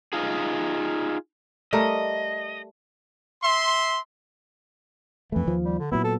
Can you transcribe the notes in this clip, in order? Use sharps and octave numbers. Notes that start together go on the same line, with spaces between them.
D#4 F4 G#4
G3 A3 A#4 D#5
E5 C6
F2 E3 A3
D#2 F3
G3
D3
A#2 F#3 B3 E4
A4